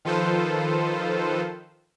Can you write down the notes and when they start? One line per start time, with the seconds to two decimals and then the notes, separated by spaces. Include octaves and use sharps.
0.05 D#3 F3 F4 A4 B4 C5